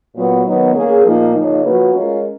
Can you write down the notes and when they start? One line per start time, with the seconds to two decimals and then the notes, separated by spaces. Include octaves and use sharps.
0.14 A#2 F#3 B3
0.44 D#3 F#3 B3
0.73 A#3 C#4 G#4
1.04 A#2 F3 A#3 D#4
1.33 C#3 F3 A#3 D#4
1.64 F3 A#3 C#4 F#4 B4
1.94 G#3 C#4 F4 A#4